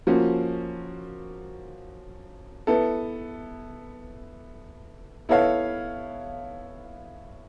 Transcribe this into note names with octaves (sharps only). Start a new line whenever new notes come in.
F3 A#3 C#4 F#4
B3 E4 A4
B3 E4 A4 C#5 F5